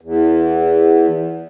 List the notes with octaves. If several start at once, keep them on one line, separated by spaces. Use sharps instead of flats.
E2